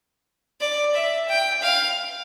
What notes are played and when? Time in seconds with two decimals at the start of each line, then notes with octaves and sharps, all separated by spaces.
0.60 D5
0.94 E5
1.28 G5
1.62 F5